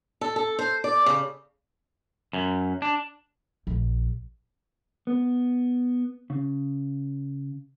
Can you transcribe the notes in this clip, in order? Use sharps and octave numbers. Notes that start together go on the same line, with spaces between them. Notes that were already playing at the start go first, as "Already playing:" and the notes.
A4
A4
C5
D5
C#3
F#2
D4
A#1
B3
C#3